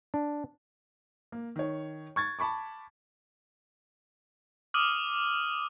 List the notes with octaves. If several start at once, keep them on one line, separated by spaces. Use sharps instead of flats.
D4
A#3
D#3 C#5
C#6 G#6 A6
A5 B5 C#6 D6
D6 D#6 F6 D#7 F#7